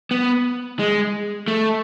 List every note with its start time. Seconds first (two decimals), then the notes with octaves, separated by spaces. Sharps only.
0.11 B3
0.79 G#3
1.48 A3